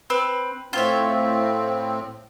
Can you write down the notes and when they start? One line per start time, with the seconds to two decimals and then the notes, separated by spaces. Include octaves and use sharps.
0.10 C4 B4
0.73 A2 C4 F4 C#5 E5